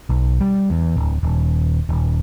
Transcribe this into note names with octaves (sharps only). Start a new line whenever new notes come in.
B1
G3
E2
D1
D#1
D#1